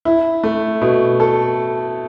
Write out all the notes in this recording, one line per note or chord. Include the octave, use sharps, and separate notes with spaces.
E4
A3
B2
A4